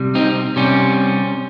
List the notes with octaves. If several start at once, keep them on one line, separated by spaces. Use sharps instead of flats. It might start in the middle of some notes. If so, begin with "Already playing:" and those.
Already playing: C3 G3
C4 D#4
C3 G3 C#4